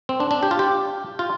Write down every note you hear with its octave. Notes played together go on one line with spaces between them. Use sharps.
C4
D4
D4
G4
F4
G4
F4